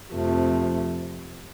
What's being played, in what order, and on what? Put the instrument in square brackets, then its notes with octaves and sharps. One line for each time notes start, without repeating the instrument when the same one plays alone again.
[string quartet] F2 C3 F3 A3